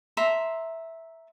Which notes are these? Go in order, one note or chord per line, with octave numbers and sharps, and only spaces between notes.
E5 A#5 C6